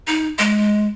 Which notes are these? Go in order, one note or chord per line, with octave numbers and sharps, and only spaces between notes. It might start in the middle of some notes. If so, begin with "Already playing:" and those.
D#4
G#3